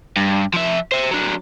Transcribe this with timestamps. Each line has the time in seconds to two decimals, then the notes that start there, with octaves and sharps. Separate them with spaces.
0.17 G2
0.53 F3 E5
0.92 C5 E5
1.11 F#3 D4